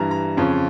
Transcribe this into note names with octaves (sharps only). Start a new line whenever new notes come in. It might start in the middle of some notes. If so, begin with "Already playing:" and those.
Already playing: G2 E3 G3 A#5
A#5
F2 C#3 F3